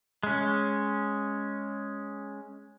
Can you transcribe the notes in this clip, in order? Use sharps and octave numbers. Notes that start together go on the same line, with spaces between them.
G#3 C#4